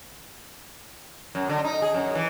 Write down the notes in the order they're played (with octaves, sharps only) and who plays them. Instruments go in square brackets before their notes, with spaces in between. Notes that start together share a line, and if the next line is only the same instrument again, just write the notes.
[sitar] F#2
D3
D#4
G#4
F#2
E3